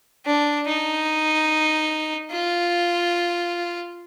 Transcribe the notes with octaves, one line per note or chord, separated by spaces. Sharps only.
D4
D#4
F4